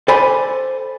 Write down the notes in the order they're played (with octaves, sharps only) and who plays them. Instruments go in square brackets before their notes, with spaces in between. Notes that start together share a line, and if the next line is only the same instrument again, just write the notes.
[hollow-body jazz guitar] A4 C5 D5 G#5 B5